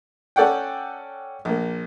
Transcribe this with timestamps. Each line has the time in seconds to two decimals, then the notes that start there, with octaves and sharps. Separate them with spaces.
0.36 C#4 A4 D5 F#5 G5
1.45 A#1 A#3